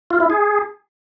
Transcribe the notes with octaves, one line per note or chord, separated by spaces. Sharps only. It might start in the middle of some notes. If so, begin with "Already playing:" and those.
F4
E4
G#4